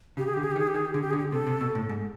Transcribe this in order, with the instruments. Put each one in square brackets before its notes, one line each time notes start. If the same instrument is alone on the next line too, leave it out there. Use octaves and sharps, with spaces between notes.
[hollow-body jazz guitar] C#3 [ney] G4
[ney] G#4
[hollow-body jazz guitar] D3 [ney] G4
[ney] G#4
G4
[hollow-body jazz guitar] D#3
[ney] G#4
G4
[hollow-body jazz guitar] D#3 [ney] G#4
[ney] G4
[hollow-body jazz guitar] D3 [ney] G#4
[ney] G4
[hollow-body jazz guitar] D3 [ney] G#4
[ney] G4
[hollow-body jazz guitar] C3 [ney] A4
[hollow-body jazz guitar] C3
B2
A2
G#2